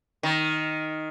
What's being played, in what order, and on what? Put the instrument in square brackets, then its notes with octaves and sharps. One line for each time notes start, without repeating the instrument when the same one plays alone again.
[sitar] D#3